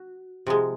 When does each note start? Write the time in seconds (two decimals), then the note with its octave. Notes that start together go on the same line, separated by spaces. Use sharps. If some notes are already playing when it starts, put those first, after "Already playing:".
Already playing: F#4
0.47 C3 F3 G#3